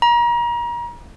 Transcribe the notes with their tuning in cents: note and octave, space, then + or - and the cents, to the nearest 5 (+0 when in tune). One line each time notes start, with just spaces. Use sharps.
A#5 +35